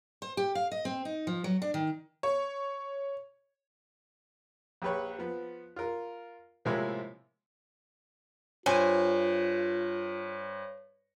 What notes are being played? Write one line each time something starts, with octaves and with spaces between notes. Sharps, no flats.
C5
G4
F5
D#5
C4
D#4
F3
F#3
D4
D#3
C#5
A#1 G4 B4 C#5
F3 B3
F4 A#4
A2 C3 F3 G#3 A#3 E4
G2 F4 C5 C#5 G#5